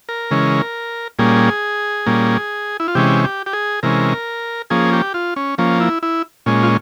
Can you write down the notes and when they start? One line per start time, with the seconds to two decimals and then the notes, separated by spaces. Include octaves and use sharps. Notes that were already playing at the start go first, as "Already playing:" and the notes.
0.09 A#4
0.31 C#3 E3 G#3 C#4
1.19 A#2 G3 A#3 C#4 G#4
2.06 A#2 G3 A#3 C#4
2.80 E4
2.88 F4
2.95 C3 E3 G#3 C#4 G4
3.24 G4
3.46 G4
3.53 G#4
3.83 C3 E3 G#3 C#4 A#4
4.70 F3 A#3 C#4 G#4
4.93 G4
5.14 F4
5.36 C#4
5.58 F3 A#3 C#4
5.81 E4
6.03 E4
6.46 A#2 G#3 C#4
6.63 F4